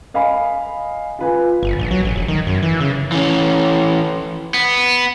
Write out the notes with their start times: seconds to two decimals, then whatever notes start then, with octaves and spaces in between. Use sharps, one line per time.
0.14 D#5 F5 G#5 B5
1.19 F4 B4 G#5
1.63 G1
1.79 A#1
1.91 F#3
2.04 A1
2.16 E1
2.28 D#3
2.47 F#2
2.62 E3
2.80 C#3
3.12 E3 C#4
4.54 B3